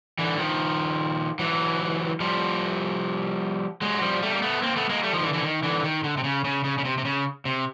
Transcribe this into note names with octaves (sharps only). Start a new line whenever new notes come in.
D3 E3
D#3 F3
E3 F#3
F3 G3
F#3 G#3
F3 G3
G3 A3
A#3
A3 B3
A#3 C4
A3 B3
G#3 A#3
G3 A3
D#3 F3
D3 E3
D3 E3
D#3
D3 E3
D#3
D3
C3
C#3
C#3
C#3
C#3
C3
C3
C#3
C3